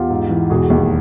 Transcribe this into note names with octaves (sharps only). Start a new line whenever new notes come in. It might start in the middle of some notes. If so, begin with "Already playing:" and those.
Already playing: E2 F4 G4
G#2
E3
E1 F#4 G#4
D#2